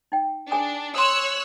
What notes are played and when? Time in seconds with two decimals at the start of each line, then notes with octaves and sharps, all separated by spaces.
0.12 D#4 G5
0.51 D4 G#4 G#5 D#6
0.95 C#5 C6 D#6 E6 F#6